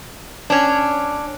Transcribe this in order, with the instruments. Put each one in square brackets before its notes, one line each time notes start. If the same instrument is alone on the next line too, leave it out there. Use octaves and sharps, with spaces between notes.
[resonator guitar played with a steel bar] C#4 D4